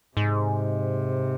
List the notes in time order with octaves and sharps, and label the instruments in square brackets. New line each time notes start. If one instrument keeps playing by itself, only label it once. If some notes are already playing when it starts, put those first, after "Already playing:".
[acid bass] G#2 [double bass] C3